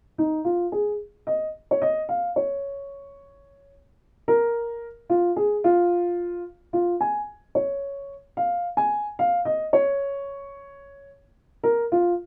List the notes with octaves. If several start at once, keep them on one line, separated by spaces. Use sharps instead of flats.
D#4
F4
G#4
D#5
C#5
D#5
F5
C#5
A#4
F4
G#4
F4
F4
G#5
C#5
F5
G#5
F5
D#5
C#5
A#4
F4